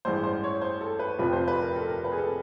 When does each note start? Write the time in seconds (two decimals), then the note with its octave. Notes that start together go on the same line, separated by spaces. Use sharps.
0.05 A1 G2 E3 G#3 C5
0.24 C5
0.44 C#5
0.61 C5
0.81 A4
0.99 B4
1.18 F1 F2 C3 F3 B4
1.33 C5
1.48 B4
1.62 A#4
1.76 A4
1.90 A#4
2.04 B4
2.12 G#4
2.18 A4